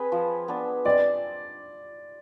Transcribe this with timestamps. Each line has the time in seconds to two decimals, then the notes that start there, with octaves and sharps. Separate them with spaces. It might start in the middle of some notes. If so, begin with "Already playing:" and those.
Already playing: C4 G#4 B4
0.12 F3
0.48 B3 D4
0.85 C4 D5